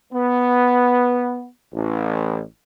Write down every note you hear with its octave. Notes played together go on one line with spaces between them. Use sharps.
B3
A1